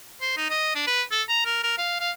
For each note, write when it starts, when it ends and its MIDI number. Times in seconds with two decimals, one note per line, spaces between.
0.21 0.36 72
0.37 0.49 63
0.50 0.71 75
0.75 0.83 62
0.87 1.02 71
1.11 1.23 69
1.29 1.41 82
1.45 1.59 70
1.63 1.77 70
1.78 1.98 77
2.00 2.11 77